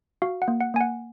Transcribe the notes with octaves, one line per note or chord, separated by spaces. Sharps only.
F#4 F5
F#5
A#3
F#5
A#3 G#5
F#5